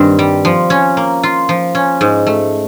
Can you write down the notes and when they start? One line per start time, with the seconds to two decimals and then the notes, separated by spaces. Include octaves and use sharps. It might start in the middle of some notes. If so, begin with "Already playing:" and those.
Already playing: G2 D#3 C4
0.19 G3
0.45 F3
0.70 C#4
0.97 A#3
1.23 F4
1.49 F3
1.75 C#4
2.01 G#2
2.27 A3